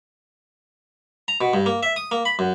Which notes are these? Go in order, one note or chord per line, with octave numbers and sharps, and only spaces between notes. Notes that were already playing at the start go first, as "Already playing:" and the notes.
A#5
B2
G2
A#3
E5
D#6
A#3
B5
F#2